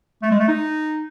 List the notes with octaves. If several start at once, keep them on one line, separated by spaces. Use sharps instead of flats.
A3
G#3
A3
D#4